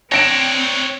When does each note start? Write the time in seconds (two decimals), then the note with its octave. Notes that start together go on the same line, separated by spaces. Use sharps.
0.12 C4 D4 C#5 A#6 D7 E7